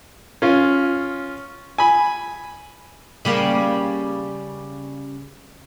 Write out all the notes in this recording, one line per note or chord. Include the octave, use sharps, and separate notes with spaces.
C#4 F4
G#5 B5
C#3 G3 A#3